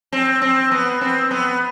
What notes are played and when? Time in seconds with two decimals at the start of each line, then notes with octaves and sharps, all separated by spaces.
0.13 C4
0.42 C4
0.71 B3
1.01 C4
1.31 B3